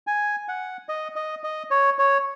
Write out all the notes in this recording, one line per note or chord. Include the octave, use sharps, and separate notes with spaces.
G#5
F#5
D#5
D#5
D#5
C#5
C#5